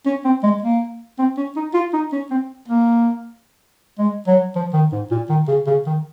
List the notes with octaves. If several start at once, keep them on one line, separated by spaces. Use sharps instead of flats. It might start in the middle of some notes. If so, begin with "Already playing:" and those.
C#4
C4
G#3
A#3
C4
C#4
D#4
F4
D#4
C#4
C4
A#3
G#3
F#3
F3
D#3
G#2
A#2
D#3
C#3
C#3
D#3